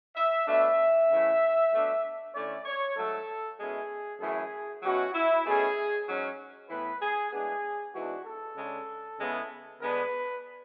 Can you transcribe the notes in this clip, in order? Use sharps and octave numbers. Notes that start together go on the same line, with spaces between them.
E5
B2 A3 D4 E5
C#3 E3 A3
B2 A3 D4
D3 A3 C#4 E4 D5
C#5
G#2 F#3 A3 A4
B2 G#3 C#4 E4 G#4
F#2 E3 A3 E4 G#4
B2 F#3 C#4 E4 F#4
E4
B2 A3 C#4 E4 G#4
G#2 F#3 C#4
A2 E3 B3 B4
G#4
A2 G#3 B3 D4 G#4
G#2 E3 B3 D4 F#4
A4
C#3 G#3 D4
C#3 G#3 B3 E4
D3 G#3 B3 D4 B4